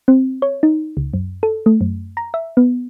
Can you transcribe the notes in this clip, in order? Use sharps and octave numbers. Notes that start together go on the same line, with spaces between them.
C4
C#5
D#4
C#2
F#2
A4
A3
F#2
A#5
E5
B3